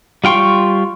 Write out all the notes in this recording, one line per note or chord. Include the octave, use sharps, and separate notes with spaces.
G3 F4 G5 C6 C#6